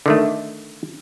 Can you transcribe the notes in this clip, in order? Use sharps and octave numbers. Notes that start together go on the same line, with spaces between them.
D3 D#3 A3